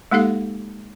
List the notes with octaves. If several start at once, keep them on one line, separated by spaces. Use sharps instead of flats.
G#3 A#3 D#4 G4 A4 F5